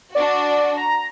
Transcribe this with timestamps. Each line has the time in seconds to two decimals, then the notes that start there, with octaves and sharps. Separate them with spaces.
0.15 D4 F#4 D5
0.77 A#5